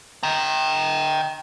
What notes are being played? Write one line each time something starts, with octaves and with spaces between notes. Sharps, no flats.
G5 A#5